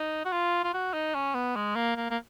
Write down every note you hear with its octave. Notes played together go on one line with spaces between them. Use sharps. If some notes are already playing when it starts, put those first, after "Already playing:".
Already playing: D#4
F#4
F4
F4
F#4
D#4
C#4
B3
G#3
A#3
A#3
A#3